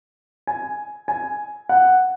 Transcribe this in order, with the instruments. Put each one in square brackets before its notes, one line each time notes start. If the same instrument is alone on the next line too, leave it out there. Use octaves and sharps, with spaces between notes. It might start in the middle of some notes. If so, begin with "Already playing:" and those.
[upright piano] G#5
G#5
F#5